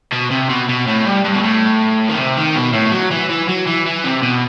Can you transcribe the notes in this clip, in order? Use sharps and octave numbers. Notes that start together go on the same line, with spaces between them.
B2
C3
B2
B2
A2
G2
G2
B2
A2
D#3
C3
D#3
B2
A2
F#3
E3
E3
F#3
E3
E3
C3
B2